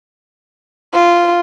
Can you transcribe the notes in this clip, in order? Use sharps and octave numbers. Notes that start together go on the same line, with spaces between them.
F4